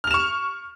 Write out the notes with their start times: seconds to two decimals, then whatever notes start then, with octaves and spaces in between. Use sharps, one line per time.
0.04 F6
0.07 F7
0.11 E7
0.14 C#6